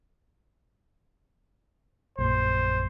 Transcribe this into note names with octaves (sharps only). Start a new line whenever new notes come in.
A#1 F#2 C5